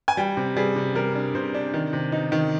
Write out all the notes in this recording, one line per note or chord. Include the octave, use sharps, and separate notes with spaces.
G#5
G3 G5
C3
G3 G#4
C3
G3 A#4
D4
C3 C5
D4
D#3
C3
D#4
D#3